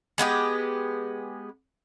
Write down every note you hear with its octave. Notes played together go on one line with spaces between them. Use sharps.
G#3 B3 E4 G4